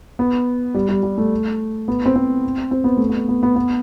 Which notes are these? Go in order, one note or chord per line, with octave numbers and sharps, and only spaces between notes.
B3
G3
G3
G3
A3
B3
C4
C4
C4
B3
A3
B3
B3
B3
B3